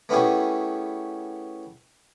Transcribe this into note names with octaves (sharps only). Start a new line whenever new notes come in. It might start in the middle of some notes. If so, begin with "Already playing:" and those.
A3 B3 C#4 E4 G4 G#4